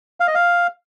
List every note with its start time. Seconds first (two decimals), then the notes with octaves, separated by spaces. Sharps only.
0.20 F5
0.28 D#5
0.35 F5